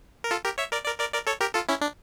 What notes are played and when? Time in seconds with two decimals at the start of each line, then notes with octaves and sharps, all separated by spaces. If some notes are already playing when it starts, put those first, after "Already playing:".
0.24 A#4
0.31 F4 A4
0.44 G4 A#4
0.58 C#5 E5
0.72 A#4 D5
0.85 A#4 D5
1.00 A#4 D5
1.13 A#4 D5
1.27 A4 C#5
1.41 G4 A#4
1.54 F4 A4
1.69 C#4 E4
1.81 D4